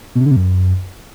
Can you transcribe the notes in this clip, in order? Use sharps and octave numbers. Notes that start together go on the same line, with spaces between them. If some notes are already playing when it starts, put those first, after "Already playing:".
B2
C3
D3
C3
F#2